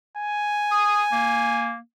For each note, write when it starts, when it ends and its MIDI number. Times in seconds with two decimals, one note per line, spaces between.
0.17 1.73 80
0.71 1.01 87
1.12 1.78 58